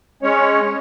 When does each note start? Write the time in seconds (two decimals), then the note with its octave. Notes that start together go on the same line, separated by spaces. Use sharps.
0.23 G#3 C#4 C#5